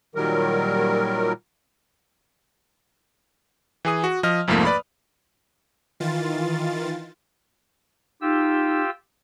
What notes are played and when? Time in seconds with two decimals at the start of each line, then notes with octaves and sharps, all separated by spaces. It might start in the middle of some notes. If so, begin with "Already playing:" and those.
0.15 A#2 D#3 F#3 G3 A#4
3.85 E3 G#4 D#6
4.04 F#4
4.23 F3 D#5 F6
4.47 C2 F2 G#2 F3 A3 A#3
4.65 B4 D5 B5
6.00 D#3 E3 F4 A6
8.21 D#4 F4 G4 E6